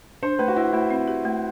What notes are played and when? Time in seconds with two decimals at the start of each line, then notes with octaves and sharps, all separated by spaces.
0.23 D4 C5
0.39 A3 B4
0.48 F#4
0.57 E4 C5
0.73 A3 E4
0.91 C4
1.08 G4
1.25 A3